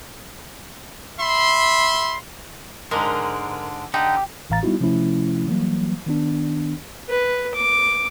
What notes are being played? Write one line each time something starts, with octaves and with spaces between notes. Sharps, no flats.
E5 B5 C6
G#2 D3 G#3 A#4
D3 D#4 G4
A1 A2 E3 F5 A#5 A6
G3 B3 D#4 E4 F#4
C3 F3 A3 C#4 E4
E3 F#3 G3 A#3
D#3 B3 D4
B4
D6